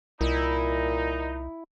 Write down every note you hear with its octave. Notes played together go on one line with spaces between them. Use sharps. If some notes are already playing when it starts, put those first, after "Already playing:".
C2 A#2 D#4 E4